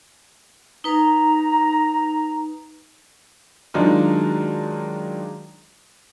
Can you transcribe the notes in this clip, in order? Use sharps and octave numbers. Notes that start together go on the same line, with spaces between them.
D#4 B4 A#5
D#3 F#3 G#3 D4 D#4 F4